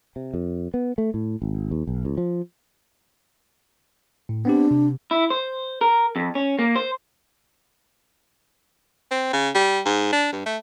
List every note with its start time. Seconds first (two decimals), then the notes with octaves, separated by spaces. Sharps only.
0.16 C3
0.34 F2
0.74 B3
0.98 A3
1.14 A2
1.42 G#1
1.71 D#2
1.87 B1
2.05 C#2
2.17 F3
4.29 A2
4.45 B3 C4 D4 G4
4.71 C3
5.11 E4
5.30 C5
5.81 A#4
6.16 F2
6.35 C#4
6.59 A#3
6.76 C5
9.11 C4
9.33 C#3
9.55 G3
9.85 G#2
10.12 D4
10.32 G2
10.46 A3